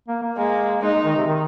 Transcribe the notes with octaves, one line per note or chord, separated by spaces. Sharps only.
A#3
A#3
G#3 A#3
G#3 D#4
G#3
D#3
C3
D#3